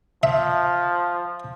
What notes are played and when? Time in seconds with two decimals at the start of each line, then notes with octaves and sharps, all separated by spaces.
0.23 F3 E5